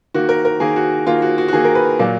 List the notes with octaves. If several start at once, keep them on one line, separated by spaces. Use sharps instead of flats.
D#3 A#3 F#4
A#4
A#4
D#3 A#3 G#4
F#4
D#3 A#3 F4
F#4
F#4
F#4
D#3 A#3 G#4
A#4
B4
A#2 F#3 A#3